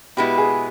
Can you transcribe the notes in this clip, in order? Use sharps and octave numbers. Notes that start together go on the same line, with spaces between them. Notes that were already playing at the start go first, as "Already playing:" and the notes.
B2 G#3 B3 E4 G4
G#4